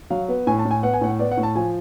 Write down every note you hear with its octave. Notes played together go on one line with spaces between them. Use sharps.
F#3 F5
B3
A2 G#5
A5
A2
G#5
B3 F#5
G#5
A2 F#5
B3 D5
F#5
A2
A5
F3 G#5